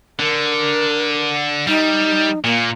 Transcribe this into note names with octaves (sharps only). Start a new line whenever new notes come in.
D3 A#4
G3 D#4
A#2 A#3